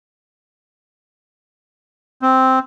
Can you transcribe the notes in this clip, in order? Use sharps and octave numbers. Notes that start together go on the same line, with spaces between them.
C4